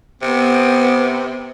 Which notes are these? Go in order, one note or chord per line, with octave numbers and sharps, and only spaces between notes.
C3 B3